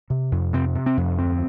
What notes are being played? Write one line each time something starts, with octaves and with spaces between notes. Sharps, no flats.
C3
F2
C3 C4
C3
C4
F2
D2 C4